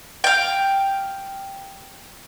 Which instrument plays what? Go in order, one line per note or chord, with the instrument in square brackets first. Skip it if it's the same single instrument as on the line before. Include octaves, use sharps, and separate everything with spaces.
[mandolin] F5 G5